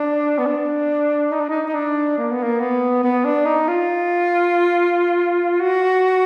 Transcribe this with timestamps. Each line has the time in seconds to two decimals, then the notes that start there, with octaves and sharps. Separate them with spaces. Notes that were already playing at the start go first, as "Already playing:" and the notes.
Already playing: D4
0.38 B3
0.46 D4
1.32 D#4
1.40 D4
1.49 D#4
1.68 D#4
1.75 D4
2.18 A#3
2.31 B3
2.43 A#3
2.60 B3
3.04 B3
3.25 D4
3.46 D#4
3.68 F4
5.60 F#4